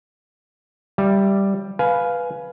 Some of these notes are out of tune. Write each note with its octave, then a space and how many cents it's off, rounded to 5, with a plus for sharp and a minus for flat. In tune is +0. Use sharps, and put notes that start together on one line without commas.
G3 +0 E5 +15
B4 +0 F5 +0 G#5 +15